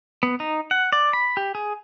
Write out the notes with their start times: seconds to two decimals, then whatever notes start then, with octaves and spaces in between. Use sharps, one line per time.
0.23 B3
0.40 D#4
0.71 F#5
0.93 D5
1.13 B5
1.37 G4
1.55 G#4